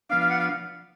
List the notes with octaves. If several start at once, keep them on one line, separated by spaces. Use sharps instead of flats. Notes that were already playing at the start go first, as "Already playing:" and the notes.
F3 B3 D4 F5
F5
F#5
F5